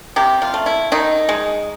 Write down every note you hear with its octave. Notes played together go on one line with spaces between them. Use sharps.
C3 G4
F4
A3
E4
D#3 D#4
G#3